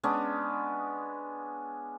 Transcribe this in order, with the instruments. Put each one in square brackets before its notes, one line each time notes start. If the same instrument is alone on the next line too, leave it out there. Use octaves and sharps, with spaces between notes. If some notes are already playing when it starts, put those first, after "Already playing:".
[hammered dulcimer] G#3 B3 C#4 D4